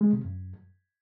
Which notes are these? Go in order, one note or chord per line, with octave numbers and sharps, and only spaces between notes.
G#3
C3
F#2